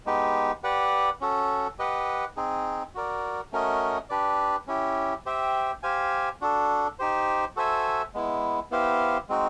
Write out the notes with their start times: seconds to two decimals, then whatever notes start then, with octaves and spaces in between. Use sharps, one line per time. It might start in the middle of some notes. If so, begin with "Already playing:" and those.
0.06 G#3 B3 D#4 G4
0.63 G4 B4 D5 F#5
1.21 C#4 F#4 A4
1.79 G4 B4 D#5 F#5
2.37 C4 D#4 G#4
2.95 F#4 A#4 D5
3.52 A3 C#4 F#4 A#4 D#5
4.10 D4 G4 B4 D5
4.67 C#4 E4 G4
5.26 G4 C5 E5 G5
5.83 G4 C5 F5 G#5
6.41 D4 F#4 A4
6.99 D#4 G4 C5
7.56 F#4 A4 C5 E5 G#5
8.14 G#3 B3 E4
8.71 B3 E4 G4 C5 F5
9.29 G#3 C4 D#4 F#4